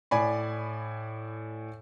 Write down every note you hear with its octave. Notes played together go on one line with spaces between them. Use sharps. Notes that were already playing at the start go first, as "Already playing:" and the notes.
A2 D5 G#5 B5